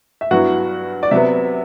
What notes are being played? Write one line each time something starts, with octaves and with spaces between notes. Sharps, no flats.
E5
G2 F#3 B3 E4 F#4 F#5
D5
C3 F#3 B3 E5